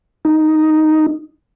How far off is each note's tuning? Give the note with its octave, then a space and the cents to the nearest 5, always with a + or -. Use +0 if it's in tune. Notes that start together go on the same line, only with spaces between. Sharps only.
D#4 +0